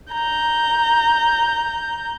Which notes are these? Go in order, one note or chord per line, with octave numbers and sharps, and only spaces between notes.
A#5 G6